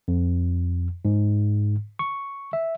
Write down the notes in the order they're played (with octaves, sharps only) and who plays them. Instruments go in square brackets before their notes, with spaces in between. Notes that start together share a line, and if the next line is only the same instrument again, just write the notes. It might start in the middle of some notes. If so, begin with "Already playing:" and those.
[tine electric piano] F2
G#2
C#6
E5